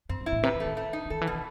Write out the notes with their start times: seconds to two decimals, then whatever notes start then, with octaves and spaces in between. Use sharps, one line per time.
0.09 F#2 C4
0.21 F#2
0.26 E4
0.32 A2
0.43 C3 B4
0.55 E3
0.60 A3
0.66 D#3
0.77 A3
0.93 D#4
1.05 C3
1.10 D#3 A4
1.21 E3
1.27 B2
1.32 D#3